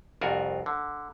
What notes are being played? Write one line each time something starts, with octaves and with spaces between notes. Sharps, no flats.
C2 F2 F4 F#4 A#4 G#5
D3